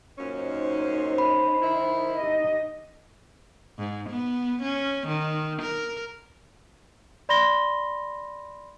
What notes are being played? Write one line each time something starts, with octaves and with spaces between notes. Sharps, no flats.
F#2 A#2 C#4 D#4 C5
B5
D#3 E4
D#4 G4 D#5
G#2
B3
C#4
D#3
A#4
D5 B5 C6 A#6 G7